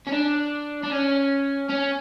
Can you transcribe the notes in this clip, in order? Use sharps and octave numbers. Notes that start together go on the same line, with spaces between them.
C#4
D4
D4
C#4
C#4